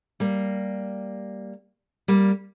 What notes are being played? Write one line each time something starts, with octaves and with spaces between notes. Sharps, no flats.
G3 A#3
G3 A#3